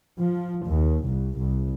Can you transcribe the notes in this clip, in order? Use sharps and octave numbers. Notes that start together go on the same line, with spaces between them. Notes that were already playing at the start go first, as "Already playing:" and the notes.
F3
D#2
C2
C2